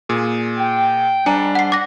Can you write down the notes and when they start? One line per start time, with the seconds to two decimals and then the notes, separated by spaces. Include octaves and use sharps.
0.09 A#2 G#4
0.57 G5
1.26 G#2 G3 D4 G#5 A#5
1.55 F#5 C7
1.72 F#5 D6 A#6